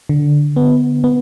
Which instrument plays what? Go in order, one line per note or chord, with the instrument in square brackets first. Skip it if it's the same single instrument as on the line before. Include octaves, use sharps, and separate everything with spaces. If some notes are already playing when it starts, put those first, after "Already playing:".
[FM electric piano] D3
B3
B3